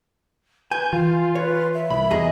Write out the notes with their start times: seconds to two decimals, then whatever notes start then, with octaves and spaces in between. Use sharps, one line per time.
0.71 B4 G#5 G6
0.93 E3 F4 F5
1.35 B4 C#5
1.74 E5
1.90 C2 B5
2.11 E2 G#4 D#5 A#5